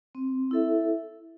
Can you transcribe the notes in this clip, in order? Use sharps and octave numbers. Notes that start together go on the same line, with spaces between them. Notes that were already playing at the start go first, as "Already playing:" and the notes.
C4
E4 A4 E5